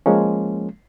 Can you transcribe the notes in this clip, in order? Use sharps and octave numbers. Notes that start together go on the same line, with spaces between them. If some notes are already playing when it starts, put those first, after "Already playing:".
F3 G#3 A#3 C#4